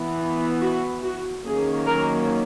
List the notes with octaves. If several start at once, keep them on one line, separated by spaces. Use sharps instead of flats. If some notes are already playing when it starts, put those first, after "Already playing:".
Already playing: E3 B3
F#4
F#4
D#3 F#3 A#3 C#4 G#4
A#4